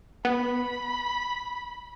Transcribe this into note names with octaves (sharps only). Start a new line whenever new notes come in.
B3 B5